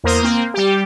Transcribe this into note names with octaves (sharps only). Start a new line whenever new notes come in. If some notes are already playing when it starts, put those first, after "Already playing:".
E2 A#3 A#4 C5 D#6
A#3 C4
G3 G4